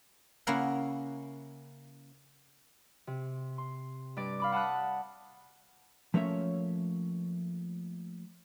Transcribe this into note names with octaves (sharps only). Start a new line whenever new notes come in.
C#3 A#3 C#4 E4 A#4 F#5
C3
C6
G2 D5
F5 B5 D6
F#5 A5 B5 D#6 F#6
F3 A3 A#3 C#4 C#5 E5